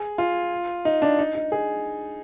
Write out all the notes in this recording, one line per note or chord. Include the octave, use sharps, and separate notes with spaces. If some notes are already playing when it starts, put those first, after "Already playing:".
Already playing: G#4
F4
D#4
D4
D#4
D#4
G#4